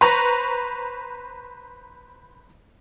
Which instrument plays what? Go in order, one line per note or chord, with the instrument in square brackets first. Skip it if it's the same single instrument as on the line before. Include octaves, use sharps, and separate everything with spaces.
[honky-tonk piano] B4 C5 A#5 C#6